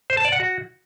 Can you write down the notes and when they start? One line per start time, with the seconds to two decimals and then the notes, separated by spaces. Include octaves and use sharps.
0.10 C5
0.17 A5
0.25 D5
0.32 F#5
0.40 F#4